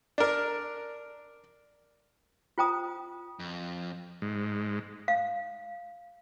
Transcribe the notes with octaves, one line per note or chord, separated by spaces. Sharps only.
D4 A#4
F4 C5 G5 A#5 D#6
F2
G#2
F5